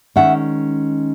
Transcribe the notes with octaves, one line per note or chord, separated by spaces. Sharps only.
D#3 G#3 C#4 E5 F#5